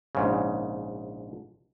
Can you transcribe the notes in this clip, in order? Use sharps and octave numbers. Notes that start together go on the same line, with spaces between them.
A#1 G#2 C#3